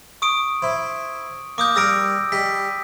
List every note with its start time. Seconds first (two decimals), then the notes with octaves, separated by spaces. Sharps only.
0.22 C#6 D#6 D7
0.62 E4 C5
1.58 A#3 D6 D#6 G6
1.76 G3 A#4 D6 E6 A#6 D7
2.32 G3 D#5 B6